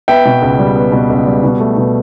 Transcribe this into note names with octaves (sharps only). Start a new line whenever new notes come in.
B3 E5 G5
B2
C#2
G3
B3
B2
C#2
G3
B2
A3
B2